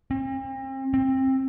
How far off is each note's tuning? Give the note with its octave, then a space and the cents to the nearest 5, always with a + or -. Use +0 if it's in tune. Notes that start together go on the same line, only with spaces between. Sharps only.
C4 +40
C4 +20